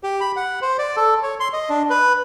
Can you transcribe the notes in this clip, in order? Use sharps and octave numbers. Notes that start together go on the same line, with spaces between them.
G4
B5
F#5
C5
D5
A4
C#5
C6
D#5
D4
B4